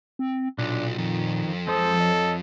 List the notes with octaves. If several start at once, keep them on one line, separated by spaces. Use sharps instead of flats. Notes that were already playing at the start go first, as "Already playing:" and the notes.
C4
B1 A#2 D4
F2 D#3
F3 G#3 A4 C5 D#6
C#5 D#5